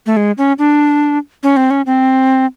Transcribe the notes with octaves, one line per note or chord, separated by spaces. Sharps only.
A3
G#3
C#4
D4
C#4
C4
C#4
C4